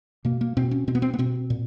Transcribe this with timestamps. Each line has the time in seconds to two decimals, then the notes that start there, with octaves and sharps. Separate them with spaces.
0.25 B2 A#3
0.41 A#3
0.57 B2 C4
0.71 C#4
0.87 B2 C4
0.95 B3
1.02 C4
1.14 B3
1.19 B2 C4
1.50 A#2